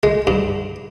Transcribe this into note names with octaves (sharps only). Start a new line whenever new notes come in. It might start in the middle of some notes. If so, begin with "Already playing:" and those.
G#3
G2